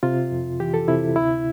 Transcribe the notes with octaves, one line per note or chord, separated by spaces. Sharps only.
C3 F4
F2
E3 G4
A4
C3 E4
D2 E4